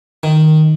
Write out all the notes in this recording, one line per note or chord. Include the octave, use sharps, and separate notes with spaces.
D#3